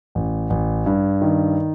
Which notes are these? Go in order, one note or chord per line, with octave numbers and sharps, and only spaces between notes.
A1
A1
G2
D#3